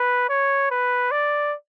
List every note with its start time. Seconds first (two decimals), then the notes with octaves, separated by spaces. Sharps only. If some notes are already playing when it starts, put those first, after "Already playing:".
Already playing: B4
0.29 C#5
0.71 B4
1.11 D5